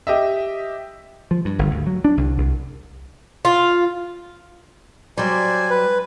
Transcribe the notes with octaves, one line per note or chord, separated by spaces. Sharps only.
G4 D#5 E5
F3
G2
G1
D2
F#3
D4
C2
C2
F4
F#3 G3 C5 D5 G#5
B4